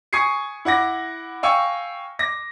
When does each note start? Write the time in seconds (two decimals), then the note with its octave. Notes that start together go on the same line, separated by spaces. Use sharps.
0.13 G#5 C#6 D#6 G#6 C7 C#7
0.65 E4 F#5 D6 A#6
1.43 F5 G5 G#5 C#6 E6 C#7
2.19 D6 A#6